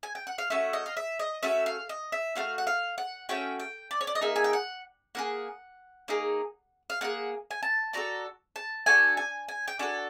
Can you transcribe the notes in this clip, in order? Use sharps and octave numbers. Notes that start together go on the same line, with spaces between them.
G#5
G5
F#5
F5
A3 C#4 F#4 E5
D#5
F5
E5
D#5
A3 C#4 F#4 E5
F5
D#5
E5
A3 C#4 F#4 F5
F#5
F5
F#5
A3 C#4 F#4 G5
G5
D5
C#5
D5
D#5
A#3 D#4 G#4 E5
G#5
G5
F#5
A#3 D#4 G#4 F#5
A#3 D#4 G#4
F5
A#3 D#4 G#4 F#5
G#5
A5
D4 F#4 A4 A#5
A5
D4 F#4 A4 G#5
G#5
G#5
G5
D4 F#4 A4 G#5